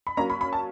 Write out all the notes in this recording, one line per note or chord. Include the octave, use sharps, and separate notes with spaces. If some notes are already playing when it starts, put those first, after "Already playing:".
B5
F#3 A#3 C#4 A#5
B5
B5
A5